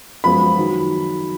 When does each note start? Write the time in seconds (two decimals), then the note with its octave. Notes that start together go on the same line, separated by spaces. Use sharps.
0.24 F#2 F3 G#3 B3 B5
0.57 D#3 F#3